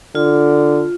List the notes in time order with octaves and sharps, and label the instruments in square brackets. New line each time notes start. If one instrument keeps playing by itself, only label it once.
[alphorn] D3 [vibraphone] F4